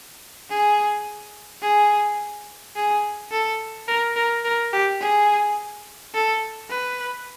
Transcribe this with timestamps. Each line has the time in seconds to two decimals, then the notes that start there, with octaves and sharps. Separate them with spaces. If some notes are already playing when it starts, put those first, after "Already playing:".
0.50 G#4
1.62 G#4
2.76 G#4
3.31 A4
3.88 A#4
4.16 A#4
4.45 A#4
4.73 G4
5.00 G#4
6.14 A4
6.70 B4